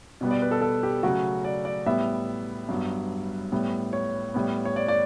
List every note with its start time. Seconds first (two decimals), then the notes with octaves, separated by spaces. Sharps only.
0.21 B2 G3 B3
0.31 D5
0.42 B4
0.51 A4
0.61 A4
0.83 G4
1.03 C#3 F#3 A3 F#4
1.44 D5
1.65 D5
1.86 A2 G3 B3 E5
2.69 G2 F#3 B3
3.52 A2 G3 B3
3.93 C#5
4.34 A2 G3 B3
4.65 C#5
4.76 D5
4.88 D5